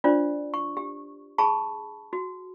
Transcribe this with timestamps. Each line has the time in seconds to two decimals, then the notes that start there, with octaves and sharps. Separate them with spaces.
0.04 D4 F4 C5 D5
0.54 C#6
0.77 G4
1.38 G#4 A5 B5 C#6
2.13 F#4